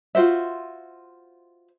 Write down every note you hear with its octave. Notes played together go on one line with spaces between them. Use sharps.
F4 F#4 C5 E5